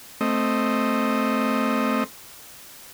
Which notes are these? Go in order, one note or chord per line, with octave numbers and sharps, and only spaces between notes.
A3 C4 D#5